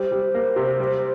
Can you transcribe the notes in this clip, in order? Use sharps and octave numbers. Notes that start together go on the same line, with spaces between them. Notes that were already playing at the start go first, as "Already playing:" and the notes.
Already playing: G3 C5
G3
A#3
C3
G3